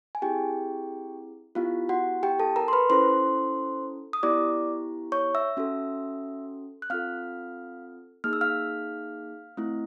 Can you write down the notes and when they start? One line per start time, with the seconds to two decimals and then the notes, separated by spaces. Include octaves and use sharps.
0.15 G#5
0.22 C4 E4 G4 G#4 G5
1.55 B3 E4 F4 G4 F5
1.89 F#4 F#5
2.23 G4 G5
2.39 A4 A5
2.56 A#4 A#5
2.68 C6
2.73 B4 B5
2.90 C#4 E4 A4 C5 C6
4.13 D#6
4.23 B3 E4 G4 D5 D6
5.12 C#5 C#6
5.35 E5 E6
5.57 C#4 F#4 A4
6.82 F#6
6.90 C4 F4 A4 F5 F6
8.24 A#3 D#4 G#4 F6
8.33 E6
8.41 F5 F6
9.57 A3 C4 E4